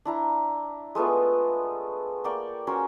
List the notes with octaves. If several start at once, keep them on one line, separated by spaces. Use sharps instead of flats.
D4 E4 A#5
G#3 A3 B3 F4
A#3 D5 G5 C#6
C#4 F#4 A#4 C5